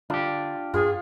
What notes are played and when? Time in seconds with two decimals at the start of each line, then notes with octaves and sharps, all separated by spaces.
0.10 D3 D4 F4 G4
0.74 G2 F4 G#4